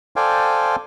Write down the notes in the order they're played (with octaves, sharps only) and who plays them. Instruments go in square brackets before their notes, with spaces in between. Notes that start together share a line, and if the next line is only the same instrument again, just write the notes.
[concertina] A4 C5 D5 F5 G5 G#5